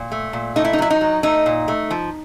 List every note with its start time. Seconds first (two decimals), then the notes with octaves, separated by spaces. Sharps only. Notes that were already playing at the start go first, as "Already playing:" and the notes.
Already playing: A#2
0.12 A3
0.33 A#2
0.56 A3 D#4
0.65 E4
0.73 D#4
0.78 F#3 E4
0.90 D#4
1.01 F#3
1.23 A3 D#4
1.46 A#2
1.68 A3
1.91 F3